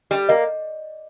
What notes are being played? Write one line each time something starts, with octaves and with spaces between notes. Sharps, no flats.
G3
A#3 D#5